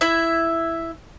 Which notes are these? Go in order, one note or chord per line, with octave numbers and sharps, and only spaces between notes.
E4 E5